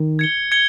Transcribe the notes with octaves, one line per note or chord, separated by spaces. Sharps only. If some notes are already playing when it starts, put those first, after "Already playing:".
Already playing: D#3
G#6 C#7 G7
G#6 C#7 G7